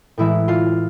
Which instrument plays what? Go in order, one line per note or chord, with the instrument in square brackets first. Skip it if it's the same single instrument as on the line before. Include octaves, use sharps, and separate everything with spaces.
[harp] A2 E3 G#3 E4 E5
F4 F5